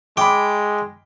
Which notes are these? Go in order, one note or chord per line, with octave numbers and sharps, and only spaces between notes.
G#3 G5 B5 D6